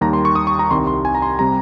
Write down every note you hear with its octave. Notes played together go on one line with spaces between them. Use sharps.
D#2 D#3 G3 A#5
C6
C#6
D#6
C#6
A#5
C2 C3 D#3 G3 C6
C6
G#5
A#5
C6
C3 G3 A#5